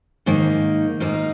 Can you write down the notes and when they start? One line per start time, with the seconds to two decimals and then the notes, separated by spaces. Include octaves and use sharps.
0.26 G#2 D#3 A#3 D#4
1.00 G#2 D#3 A#3 D#4